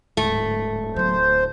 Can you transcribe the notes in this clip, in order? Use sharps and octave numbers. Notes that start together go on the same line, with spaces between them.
D1 G#2 A3
F#3 B3 C5
D3